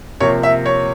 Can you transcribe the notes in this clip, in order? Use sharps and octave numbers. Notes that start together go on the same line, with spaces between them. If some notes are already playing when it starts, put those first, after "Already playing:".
C3 F3 A#3 C#5
E5
C#5